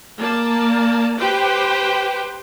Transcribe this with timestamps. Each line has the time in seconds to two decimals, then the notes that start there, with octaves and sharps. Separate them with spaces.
0.19 A#3 D5 A5
1.18 G4 B4 C5 G5